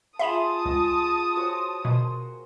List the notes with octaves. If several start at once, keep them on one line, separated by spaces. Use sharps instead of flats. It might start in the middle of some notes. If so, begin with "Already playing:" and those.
F4 G#4 E5 A5 B5 C6 D#6 E7
C#2 F4 D#5
F#4 C5 C#5
B2 A#3 C5